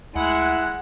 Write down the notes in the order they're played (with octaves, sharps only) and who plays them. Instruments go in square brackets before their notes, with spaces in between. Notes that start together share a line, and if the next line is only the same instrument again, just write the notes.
[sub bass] D2 [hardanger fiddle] G#3 [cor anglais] E4 [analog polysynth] F#5